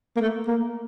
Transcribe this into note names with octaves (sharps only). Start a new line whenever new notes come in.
A#3
A3
A#3